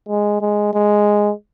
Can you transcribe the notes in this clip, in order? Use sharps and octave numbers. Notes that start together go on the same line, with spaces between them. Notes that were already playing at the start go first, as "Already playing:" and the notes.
G#3
G#3
G#3